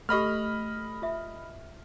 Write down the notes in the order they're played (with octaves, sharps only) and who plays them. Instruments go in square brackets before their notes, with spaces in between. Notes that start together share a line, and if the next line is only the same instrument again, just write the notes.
[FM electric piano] A3 [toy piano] G4 A4 [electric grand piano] D#5 B5 F6
[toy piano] F4 E5